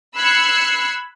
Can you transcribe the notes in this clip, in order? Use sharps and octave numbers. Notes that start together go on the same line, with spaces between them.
B5 E6 F#6 G#6 C7 C#7